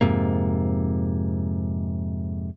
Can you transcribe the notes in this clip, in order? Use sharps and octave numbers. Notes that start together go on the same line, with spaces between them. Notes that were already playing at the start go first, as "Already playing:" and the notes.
F2 G#2 C3 A#3